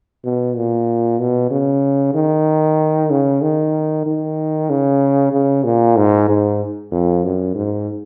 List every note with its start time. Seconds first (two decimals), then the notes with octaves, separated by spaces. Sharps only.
0.24 B2
0.56 A#2
1.19 B2
1.51 C#3
2.15 D#3
3.10 C#3
3.42 D#3
4.06 D#3
4.70 C#3
5.33 C#3
5.64 A#2
5.97 G#2
6.29 G#2
6.92 F2
7.24 F#2
7.55 G#2